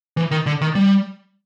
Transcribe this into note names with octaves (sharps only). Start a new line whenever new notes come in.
E3
D#3
D3
D#3
G3